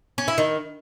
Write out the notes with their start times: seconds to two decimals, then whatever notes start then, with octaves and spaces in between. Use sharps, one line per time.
0.18 C#4
0.28 E4
0.38 D#3